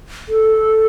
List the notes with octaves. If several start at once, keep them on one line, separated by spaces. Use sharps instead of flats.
A4